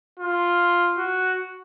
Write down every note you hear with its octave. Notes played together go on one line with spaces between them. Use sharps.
F4
F#4